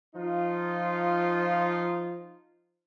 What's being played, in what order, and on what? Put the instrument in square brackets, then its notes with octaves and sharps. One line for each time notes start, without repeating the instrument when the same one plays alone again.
[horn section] F3 D#4 F4